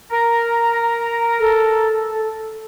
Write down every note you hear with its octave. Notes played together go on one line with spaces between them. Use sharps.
A#4 A#5
A4